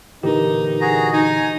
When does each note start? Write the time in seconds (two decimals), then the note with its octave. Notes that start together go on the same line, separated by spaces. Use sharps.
0.23 A#2 D3 E3 D#4 G4 A#4
0.81 F#4 G#4 A#5
1.13 D#4 G#5